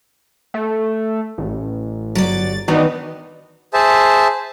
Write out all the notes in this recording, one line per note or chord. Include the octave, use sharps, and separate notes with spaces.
A3
A1
G1 F#3 D5 A6
D#3 E3 B3 D4 D#4 F#4
G#4 C5 E5 A5